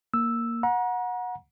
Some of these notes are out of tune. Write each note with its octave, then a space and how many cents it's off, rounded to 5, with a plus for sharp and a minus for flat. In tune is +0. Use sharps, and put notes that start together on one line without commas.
A#3 +0 E6 +0
F#5 -20 A#5 +35